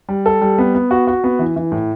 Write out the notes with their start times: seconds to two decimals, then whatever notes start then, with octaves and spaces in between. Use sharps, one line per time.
0.09 G3
0.26 A4
0.42 G3
0.58 B3
0.75 B3
0.91 F#4
1.07 F#4
1.24 B3
1.39 E3
1.56 E3
1.72 A2